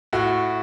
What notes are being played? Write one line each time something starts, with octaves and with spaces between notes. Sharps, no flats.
A2 F#4